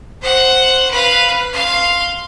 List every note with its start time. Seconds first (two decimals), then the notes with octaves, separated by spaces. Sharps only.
0.22 C5 F#5
0.90 B4 F5
1.53 F5 C6